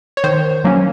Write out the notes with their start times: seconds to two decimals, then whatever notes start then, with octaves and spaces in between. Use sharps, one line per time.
0.17 C#5
0.24 D#3 C5
0.64 F#3 A#3 C#4